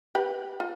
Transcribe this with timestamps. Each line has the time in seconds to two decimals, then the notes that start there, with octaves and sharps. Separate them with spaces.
0.15 G4 B4
0.60 F4